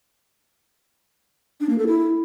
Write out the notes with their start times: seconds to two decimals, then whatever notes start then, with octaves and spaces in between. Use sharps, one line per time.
1.60 D4
1.69 A#3
1.78 A4
1.87 E4